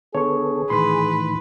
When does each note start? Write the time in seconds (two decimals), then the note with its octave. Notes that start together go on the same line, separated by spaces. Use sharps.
0.15 D3 B3 G#4 A4 C#5 C#6
0.70 A2 D#3 E3 B4 C6